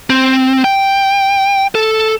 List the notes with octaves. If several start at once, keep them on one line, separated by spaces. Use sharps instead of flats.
C4
G5
A4